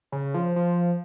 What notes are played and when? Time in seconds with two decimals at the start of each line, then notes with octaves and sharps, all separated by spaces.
0.12 C#3
0.34 F3
0.56 F3